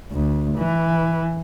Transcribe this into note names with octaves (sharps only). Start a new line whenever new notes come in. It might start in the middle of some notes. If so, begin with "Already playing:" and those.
D2
E3